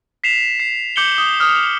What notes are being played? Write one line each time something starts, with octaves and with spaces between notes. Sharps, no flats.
B6 C7 E7 F7
C7
D6 G6 C#7 F#7 G7
D#6 G7
D#6 F6